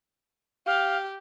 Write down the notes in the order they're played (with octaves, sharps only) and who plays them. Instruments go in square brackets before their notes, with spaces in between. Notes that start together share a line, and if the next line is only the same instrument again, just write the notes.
[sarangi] G4 [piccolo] F5